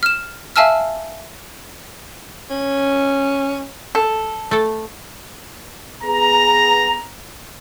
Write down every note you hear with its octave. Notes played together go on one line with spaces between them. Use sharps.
F6 E7
E5 F5 G#5 A5 E6 F6
C#4
A4
A3 A4
B3 G#4 A#5